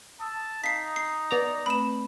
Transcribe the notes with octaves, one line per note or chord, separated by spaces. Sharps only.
A5 D#6 E6
D#4 F5 A5 B6 C7
C7
B3 D5 A#5
A3 C4 B4 B5 E7